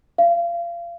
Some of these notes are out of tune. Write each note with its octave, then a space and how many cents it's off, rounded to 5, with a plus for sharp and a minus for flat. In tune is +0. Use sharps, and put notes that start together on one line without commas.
F5 -30